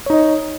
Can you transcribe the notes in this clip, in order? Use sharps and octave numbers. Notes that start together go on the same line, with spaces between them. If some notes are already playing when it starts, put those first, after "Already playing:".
D#4 C#5 D#5